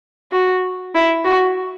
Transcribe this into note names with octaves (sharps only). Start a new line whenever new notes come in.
F#4
E4
F#4